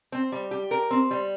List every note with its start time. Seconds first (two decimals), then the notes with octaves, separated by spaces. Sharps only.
0.12 C4
0.32 G3
0.51 G4
0.71 A#4
0.91 C4
1.11 G3